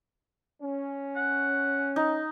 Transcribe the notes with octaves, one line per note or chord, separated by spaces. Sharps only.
C#4
F#5
D#4